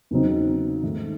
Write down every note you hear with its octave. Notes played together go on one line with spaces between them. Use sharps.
E2 C#3 F#3 C4 D#4
G#2 D#3 A3 D#4